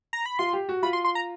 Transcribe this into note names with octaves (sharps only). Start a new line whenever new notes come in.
A#5
B5
F4 C6
G4
F#4
F4 B5
C6
C6
A#5